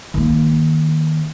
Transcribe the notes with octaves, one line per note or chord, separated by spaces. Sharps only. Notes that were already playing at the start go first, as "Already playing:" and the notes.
D#3 A#3